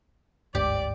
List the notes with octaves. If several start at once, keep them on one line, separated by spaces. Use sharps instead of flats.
G1 D2 G#2 G4 D5